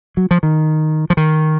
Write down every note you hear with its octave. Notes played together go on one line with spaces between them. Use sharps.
F#3
F3
D#3
F3
D#3